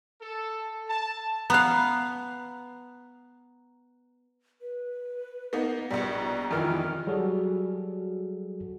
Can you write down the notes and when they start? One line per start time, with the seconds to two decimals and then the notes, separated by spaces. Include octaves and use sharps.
0.21 A4
0.89 A5
1.50 B3 F5 A#5 F#6
4.61 B4
5.53 A#3 B3 D#4
5.90 A#1 B2 G3 A#5
6.51 F2 D#3 E3 F6
7.07 F#3 G3 F#4 G#4 A4